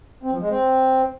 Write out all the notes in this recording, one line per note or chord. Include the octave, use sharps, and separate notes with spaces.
C4
F3
G#3
C4